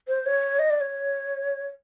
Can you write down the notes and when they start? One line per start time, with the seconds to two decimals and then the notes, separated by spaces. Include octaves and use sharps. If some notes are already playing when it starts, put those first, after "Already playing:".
0.08 C5
0.26 C#5
0.59 D#5
0.70 D5
0.81 C#5